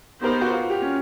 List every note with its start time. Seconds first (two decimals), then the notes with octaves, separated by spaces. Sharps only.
0.23 B3 D#4 G4 A#4 C5
0.41 F#4
0.50 F4
0.70 G4
0.82 C#4